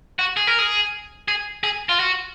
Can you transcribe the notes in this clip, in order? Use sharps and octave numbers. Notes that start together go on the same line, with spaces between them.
F#4
G#4
A#4
G#4
G#4
G#4
F4
F#4